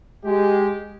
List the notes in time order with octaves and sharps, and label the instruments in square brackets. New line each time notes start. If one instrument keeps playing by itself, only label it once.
[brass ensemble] G#3 G4